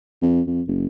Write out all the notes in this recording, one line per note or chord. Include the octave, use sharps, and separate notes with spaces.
F2
F2
F#1